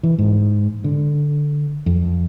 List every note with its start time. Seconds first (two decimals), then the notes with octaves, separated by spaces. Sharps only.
0.03 E3
0.19 G#2
0.84 D3
1.86 F2